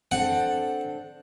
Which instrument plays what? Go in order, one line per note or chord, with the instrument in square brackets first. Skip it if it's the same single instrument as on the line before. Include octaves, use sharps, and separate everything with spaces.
[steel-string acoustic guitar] C4 D4 A4 [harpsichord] F#5